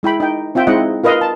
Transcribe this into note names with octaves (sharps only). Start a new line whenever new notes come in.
G#3 E4 G5 B5
D#4 G5
C4 F4 E5 G5
G#3 C4 D#4 E4 D#5 F#5
F4 A#4 B4 D#5 F5
A5